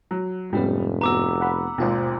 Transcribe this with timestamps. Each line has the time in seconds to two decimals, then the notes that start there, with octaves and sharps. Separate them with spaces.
0.11 F#3
0.53 F1 G#2 G3 B3 C#4
1.01 B3 F#4 A#5 D6 E6
1.41 F#5 B5
1.78 G#1 D#2 B2 F4 C5